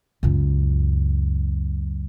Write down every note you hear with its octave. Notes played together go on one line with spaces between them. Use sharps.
C#2 F#2